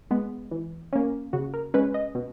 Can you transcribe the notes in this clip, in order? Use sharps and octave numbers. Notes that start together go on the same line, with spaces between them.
G#3 B3
E3
A#3 C#4
C#3 F#4
A#4
G#3 C#4 B4
D#5
B2